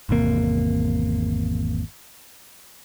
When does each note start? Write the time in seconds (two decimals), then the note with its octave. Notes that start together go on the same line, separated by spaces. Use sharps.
0.09 G#1 E2 C3 A#3